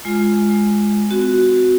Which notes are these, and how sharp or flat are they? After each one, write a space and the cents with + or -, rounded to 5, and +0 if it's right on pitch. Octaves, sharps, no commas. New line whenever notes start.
G#3 +0 F4 -5
C4 -40 F#4 +0